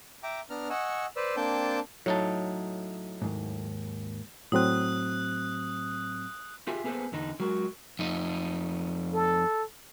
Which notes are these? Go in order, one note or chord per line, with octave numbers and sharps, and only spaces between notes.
E5 G5 A#5 D6
B3 D4 A#5 F6
D#5 F#5 G#5 C#6 E6
B4 C5 D5 E6
A#3 C4 D4 G5 A5 G6
A2 F#3 D#4 A5
D#2 G#2
A2 F#3 C4 D#6 F#6
F4 G4 G#4 E5
A#3 B3 G#4 A4 B4 C5
E2 D3 D#4
F#3 G#3 F#4 A#4
F2 D#4
A4